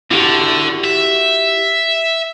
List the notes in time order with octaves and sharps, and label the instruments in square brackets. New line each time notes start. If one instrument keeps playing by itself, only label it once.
[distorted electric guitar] D3 [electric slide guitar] E4 F#4 G4
[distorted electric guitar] E5